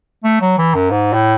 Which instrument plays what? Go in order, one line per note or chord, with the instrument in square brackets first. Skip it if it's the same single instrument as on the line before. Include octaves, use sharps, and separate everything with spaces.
[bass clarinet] A3
F#3
E3
F#2
G#2
A2